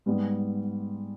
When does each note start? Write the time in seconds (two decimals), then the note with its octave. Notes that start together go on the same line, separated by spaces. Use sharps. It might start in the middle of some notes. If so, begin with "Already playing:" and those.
0.06 G#2 G3 B3